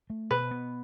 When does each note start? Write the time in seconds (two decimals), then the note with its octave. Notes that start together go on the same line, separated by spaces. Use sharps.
0.10 A3
0.31 B2 B4
0.51 B3